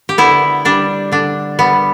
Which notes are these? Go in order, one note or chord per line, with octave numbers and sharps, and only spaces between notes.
G4
D3 B3 E4
G3 D4
D3 D4
G3 B3